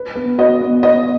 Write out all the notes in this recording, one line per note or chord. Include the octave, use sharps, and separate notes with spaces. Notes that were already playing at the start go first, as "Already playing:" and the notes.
Already playing: B4
B3
F#4 D#5
B3
B3 D#5